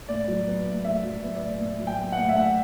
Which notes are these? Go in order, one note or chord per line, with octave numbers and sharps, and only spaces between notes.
A2 D5
F#3
B3
A2
A2 E5
F#3
B3
D5
A2
A2
F#3
G5
B3
F#5
A2
E5
A2 F#5